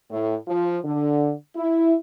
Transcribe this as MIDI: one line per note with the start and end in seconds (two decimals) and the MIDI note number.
0.11 0.35 45
0.48 0.78 53
0.83 1.32 50
1.56 1.94 64